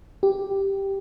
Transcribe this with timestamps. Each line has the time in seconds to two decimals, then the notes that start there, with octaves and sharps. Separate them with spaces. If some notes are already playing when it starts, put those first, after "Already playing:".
0.23 G4